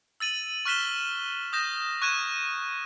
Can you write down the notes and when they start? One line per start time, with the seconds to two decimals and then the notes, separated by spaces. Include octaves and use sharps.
0.20 E6 A6 D#7 F#7
0.65 C#6 F6 F#6 B6 E7 G7
1.53 D#6 G6 A#6 E7
2.02 C#6 F#6 G#6 D#7 E7